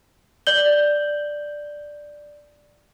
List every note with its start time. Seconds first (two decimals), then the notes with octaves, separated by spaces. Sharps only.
0.47 D5 G6 F#7 G7